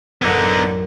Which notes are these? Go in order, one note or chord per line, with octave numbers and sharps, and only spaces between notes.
A1 F#2 D3 B3 D#4